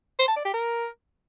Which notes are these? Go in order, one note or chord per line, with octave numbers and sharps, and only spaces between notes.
C5
A5
D5
G4
A#4